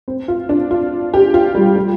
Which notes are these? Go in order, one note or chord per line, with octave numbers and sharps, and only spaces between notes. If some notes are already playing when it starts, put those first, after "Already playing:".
C4
F4
D4
F4
G4
F4
G3
G3